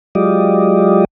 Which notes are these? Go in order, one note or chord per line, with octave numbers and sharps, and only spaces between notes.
F#3 G#3 F4 G4 D5 D#5